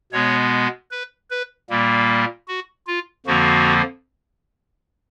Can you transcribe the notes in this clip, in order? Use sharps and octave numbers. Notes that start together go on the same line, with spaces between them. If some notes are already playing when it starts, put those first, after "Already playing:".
B2 G#3 B3 C#5
B4
B4
A#2 G3 A#3
F#4
F4
F2 D3 F3 A#3 F#4